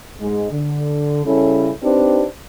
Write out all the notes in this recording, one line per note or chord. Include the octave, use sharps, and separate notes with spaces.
G#2 G#3
D3
C#3 G3 C#4 E4 A4
C4 D4 D#4 G4 B4 C5